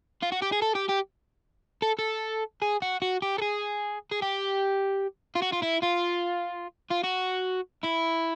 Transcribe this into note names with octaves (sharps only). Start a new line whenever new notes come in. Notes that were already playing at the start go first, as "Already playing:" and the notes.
F4
F#4
G4
G#4
A4
G4
G4
A4
A4
G#4
F#4
F#4
G4
A4
G#4
G#4
G4
F4
F#4
F4
E4
F4
F4
F#4
E4